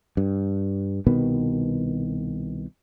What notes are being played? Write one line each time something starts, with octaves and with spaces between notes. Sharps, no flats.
G2
C2 B2 D#3 B3